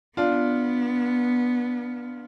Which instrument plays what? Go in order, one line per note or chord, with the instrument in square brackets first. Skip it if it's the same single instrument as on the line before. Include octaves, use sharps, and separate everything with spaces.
[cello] B3 [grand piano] D4 F4